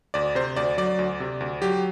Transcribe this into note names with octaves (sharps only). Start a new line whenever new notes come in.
D2 D5
C3 C5
D2 D5
F#3 D5
D2
C3
D2
F#3 G4